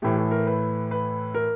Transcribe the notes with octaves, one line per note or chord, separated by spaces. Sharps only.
A2 E3 A3 G4
A4
A#4
B4
B4
A#4